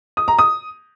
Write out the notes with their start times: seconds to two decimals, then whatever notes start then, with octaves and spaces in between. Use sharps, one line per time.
0.17 D#6
0.28 A#5
0.39 D#6